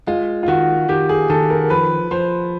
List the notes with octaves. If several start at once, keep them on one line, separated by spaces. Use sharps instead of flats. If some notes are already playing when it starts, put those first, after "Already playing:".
G#3 F4
F4
D#3 F#4
D#3 G4
G#4
D#3 A4
A#4
F3 B4
F3 C5